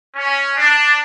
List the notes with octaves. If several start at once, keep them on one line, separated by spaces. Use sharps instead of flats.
C#4
D4